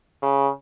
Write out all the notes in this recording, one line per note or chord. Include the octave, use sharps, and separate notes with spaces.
C#3